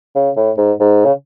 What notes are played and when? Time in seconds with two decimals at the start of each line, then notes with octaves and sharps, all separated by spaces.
0.15 C#3
0.36 A2
0.58 G#2
0.80 G#2
1.05 C#3